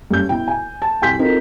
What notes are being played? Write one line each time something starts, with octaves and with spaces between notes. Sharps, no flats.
G2 C#4 G6
B2 E4 G5
G#5
A5
C2 G5 G#5 C6 G6 B6
C4 D#4 F4 F#4 A4 A#4